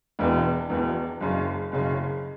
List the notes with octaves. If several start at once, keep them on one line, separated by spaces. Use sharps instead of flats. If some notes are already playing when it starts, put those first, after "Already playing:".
E1 E2 B2
E1 E2 B2
F#1 F#2 C#3
F#1 F#2 C#3